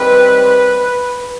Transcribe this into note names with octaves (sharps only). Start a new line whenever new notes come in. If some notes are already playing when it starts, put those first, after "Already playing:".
Already playing: D#3 G3 C4 B4